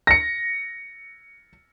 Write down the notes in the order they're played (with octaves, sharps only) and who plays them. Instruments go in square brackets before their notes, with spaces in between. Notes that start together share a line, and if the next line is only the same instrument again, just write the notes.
[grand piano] A#6 C#7